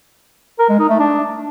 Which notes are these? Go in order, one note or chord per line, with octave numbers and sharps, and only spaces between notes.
A#4
G#3
D#4
A3
D4